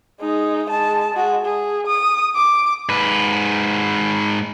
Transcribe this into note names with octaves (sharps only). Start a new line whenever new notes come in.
G#3 D#4
G#3 A5
G#3 F#4
G#4
D#6
D6
G#2 B4